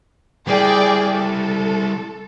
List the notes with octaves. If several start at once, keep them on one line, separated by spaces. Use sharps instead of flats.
G3 E4 G#4 D5 G5
A4